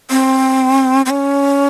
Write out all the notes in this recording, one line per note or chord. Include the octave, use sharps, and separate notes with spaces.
C4
C4
C#4